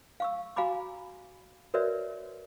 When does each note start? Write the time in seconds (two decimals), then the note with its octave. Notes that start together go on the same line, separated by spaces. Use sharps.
0.20 F5 C#6 E6
0.56 F#4 F5 G#5 A#5 B5 D6
1.74 F#4 A#4 B4 C#5 D5 E5